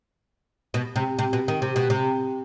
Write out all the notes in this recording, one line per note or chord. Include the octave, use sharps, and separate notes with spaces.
B2
C3
C3
B2
D#3
C3
B2
C3